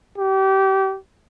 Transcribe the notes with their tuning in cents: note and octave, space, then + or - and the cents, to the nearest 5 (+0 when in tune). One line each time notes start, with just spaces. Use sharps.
G4 -30